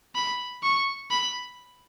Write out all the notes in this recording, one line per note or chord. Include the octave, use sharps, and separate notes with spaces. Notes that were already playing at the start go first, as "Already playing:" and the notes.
B5
C#6
B5